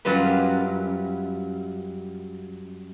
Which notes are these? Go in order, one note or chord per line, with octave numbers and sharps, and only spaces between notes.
F#2 G3 F4 B4